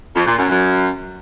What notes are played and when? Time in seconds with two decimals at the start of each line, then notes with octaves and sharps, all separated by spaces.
0.15 F2
0.26 A#2
0.38 F#2
0.49 F#2